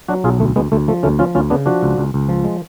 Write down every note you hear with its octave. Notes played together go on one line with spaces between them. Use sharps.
F#3 D4 F#4
B1 F4 G#4
D2 A3
D2 G#3 B3
D2 A3
F3 A3
D2 A3 C#4
F3 C#4 F4
D2 C#4 F4
C#3 B3 D4
F3 D4 F#4
C#2
C#2
C#2
F3
G#3